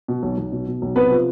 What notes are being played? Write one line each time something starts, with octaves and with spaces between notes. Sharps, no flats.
B2
B1
B1
B2
B2
B1
C3 B3 B4
F3